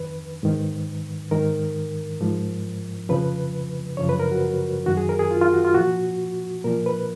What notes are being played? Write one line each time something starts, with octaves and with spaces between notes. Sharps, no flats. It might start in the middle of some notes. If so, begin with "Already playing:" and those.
Already playing: F2 D#3 B4
G#2 D#3
G#2 D#3 A#4
G#2 F3
F2 C#3 F3 B4
F#2 C#3 F3 C#5
B4
A#4
F#4
F#2 D#3 F#4
G#4
A#4
G#4
F4
F4
F#4
F4
A#2 F3 F#4
A#2 F3 A#4
B4